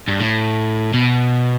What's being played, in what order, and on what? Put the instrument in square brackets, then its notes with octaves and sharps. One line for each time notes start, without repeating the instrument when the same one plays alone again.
[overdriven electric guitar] G2
A2
B2